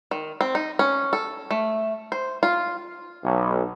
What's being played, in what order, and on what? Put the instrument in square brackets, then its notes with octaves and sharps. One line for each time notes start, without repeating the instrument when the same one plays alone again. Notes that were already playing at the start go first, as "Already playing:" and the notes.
[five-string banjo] D#3
C4
D#4
C#4
A4
A3
C5
F4
[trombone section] B1